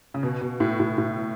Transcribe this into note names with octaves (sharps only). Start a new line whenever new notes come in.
C#3
B2
B2
A2
A2
A2